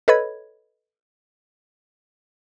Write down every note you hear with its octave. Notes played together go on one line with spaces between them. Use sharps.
A4 B4 C#5 D#5 B5 G#6